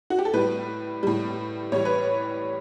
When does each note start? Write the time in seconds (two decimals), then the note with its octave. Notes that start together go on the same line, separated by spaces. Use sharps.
0.10 F#4
0.19 G4
0.25 A4
0.34 A2 G3 B4
1.03 A2 G3
1.72 A2 E3 G3 C#5
1.85 B4